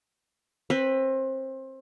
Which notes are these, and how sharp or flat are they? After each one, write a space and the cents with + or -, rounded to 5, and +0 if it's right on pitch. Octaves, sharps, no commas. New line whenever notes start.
C4 +25 B4 +0